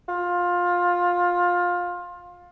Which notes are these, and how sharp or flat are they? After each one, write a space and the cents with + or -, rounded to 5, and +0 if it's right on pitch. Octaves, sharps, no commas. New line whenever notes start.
F4 +20